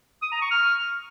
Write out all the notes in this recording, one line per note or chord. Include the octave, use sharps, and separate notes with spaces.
D#6
A#5
C#6
F6